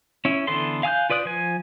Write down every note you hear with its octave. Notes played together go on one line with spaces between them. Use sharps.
C#4 E4
D3 E3 B3 A4 C6
F5 G#5 D#6 F#6 G6
F4 B4 D5 D#6 F#6
F3 G#5